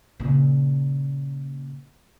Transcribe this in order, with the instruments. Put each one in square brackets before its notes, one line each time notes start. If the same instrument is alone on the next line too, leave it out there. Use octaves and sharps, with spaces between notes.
[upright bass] A#2 C#3